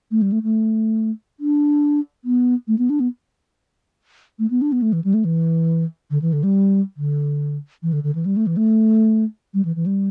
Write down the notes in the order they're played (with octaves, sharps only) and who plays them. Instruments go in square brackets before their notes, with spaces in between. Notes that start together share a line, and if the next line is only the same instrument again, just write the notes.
[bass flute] A3
G3
A3
A3
D4
B3
A3
B3
D4
B3
A3
B3
D4
B3
A3
E3
G3
A3
E3
D3
E3
D3
G3
D3
E3
D3
D3
E3
G3
A3
E3
A3
G3
E3
E3
G3